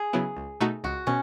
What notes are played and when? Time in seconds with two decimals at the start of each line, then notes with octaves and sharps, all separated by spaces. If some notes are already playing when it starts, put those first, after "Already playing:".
Already playing: G#4
0.13 C#3 F#3 B3 E4
0.37 C#2
0.60 B2 A3 D#4 F#4
0.84 C#2 F#4
1.07 B2 C#4